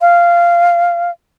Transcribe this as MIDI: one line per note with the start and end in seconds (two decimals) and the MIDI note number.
0.01 1.10 77